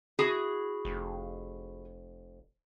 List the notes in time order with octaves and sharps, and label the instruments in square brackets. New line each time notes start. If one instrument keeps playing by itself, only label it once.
[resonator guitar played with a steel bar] E4 F#4 G#4
[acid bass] F1